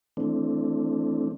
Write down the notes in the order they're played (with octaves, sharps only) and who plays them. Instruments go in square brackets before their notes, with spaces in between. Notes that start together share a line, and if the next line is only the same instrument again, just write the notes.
[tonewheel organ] E3 A3 C4 D4